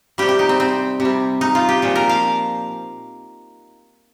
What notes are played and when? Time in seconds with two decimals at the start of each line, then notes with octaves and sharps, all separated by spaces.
0.18 C3 G3 G4
0.29 G4
0.39 D#4
0.49 C4
0.60 C4
1.00 C3
1.05 G3
1.41 D#4
1.55 F4
1.69 G4
1.82 A#2 F3
1.96 A#4
2.09 F5